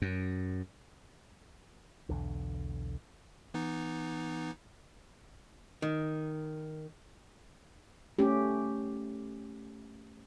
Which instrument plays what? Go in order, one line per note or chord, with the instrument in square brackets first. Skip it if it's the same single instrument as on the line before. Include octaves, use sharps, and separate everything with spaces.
[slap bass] F#2
[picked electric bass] B1 E2 D3
[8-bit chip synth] E3 B3 D#4
[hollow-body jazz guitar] D#3
[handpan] A3 C#4 G4